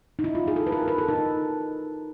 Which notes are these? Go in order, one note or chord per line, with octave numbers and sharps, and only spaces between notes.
D#4
E4
F4
G#4
A4
B4
A#4
B4
A4
D#4